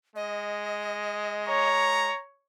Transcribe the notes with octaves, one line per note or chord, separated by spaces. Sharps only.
G#3 D#5
C#5 A#5